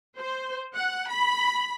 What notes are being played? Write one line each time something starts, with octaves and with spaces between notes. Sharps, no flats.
C5
F#5
B5